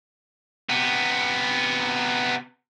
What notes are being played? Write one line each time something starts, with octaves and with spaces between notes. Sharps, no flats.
C3 B3